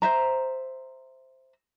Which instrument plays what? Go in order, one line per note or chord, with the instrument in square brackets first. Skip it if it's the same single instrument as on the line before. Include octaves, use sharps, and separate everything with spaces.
[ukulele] C5 E5 A#5